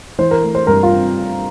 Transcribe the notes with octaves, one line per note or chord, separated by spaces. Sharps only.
E3 C5
A#4
A3
C5
G2 A#4
F4
C4